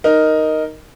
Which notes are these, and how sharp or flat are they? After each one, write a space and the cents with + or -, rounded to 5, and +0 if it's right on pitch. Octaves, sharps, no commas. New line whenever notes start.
D#4 +0 A#4 +0